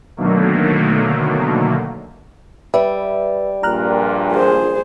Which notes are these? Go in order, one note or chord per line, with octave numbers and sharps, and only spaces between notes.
B2 D3 D#3 F#3 A3 A#3
G3 B4 E5
A#1 G2 A#2 A#5 F6 F#6
G#4 C5